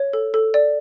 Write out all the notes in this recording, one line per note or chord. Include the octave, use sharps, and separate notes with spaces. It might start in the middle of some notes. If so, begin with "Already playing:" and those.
Already playing: C#5
A4
A4
D5